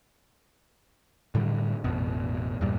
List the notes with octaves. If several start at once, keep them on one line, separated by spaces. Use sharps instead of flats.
A2 D3 G3
A1 F2 B2
E2 G2 A#2 G3